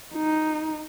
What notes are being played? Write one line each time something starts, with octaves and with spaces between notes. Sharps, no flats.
D#4